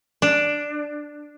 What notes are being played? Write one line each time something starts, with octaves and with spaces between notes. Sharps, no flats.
D4